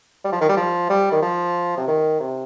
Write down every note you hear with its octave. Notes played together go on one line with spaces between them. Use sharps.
G3
F3
D#3
G3
F3
G3
D#3
F3
C3
D#3
C3